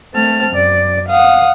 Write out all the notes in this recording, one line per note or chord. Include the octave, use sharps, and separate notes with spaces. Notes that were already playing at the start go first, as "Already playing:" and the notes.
A3 C4 A5 F6
F#2 D5
F5 F#5 D#6